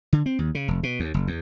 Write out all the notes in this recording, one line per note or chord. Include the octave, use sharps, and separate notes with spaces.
D3
C4
D#2
C#3
F1
B2
D#2
F#1
E2